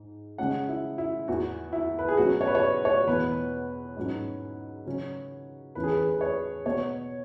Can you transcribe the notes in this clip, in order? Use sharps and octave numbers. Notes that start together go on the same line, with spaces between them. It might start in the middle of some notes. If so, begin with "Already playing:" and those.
Already playing: G#2
C#3 G#3 C#4 F#5
E4
E4
E2 E3 B3 F#4
E4
B4
G#4
B2 F#3 C#4 F#4
C#5
B4
C#5
C#5
E2 B2 B3 B4
G#2 F#3 C#4
C#3 F#3 C#4
E2 E3 C#4 B4
G#4
B4
B4
C#5
B2 B3 C#5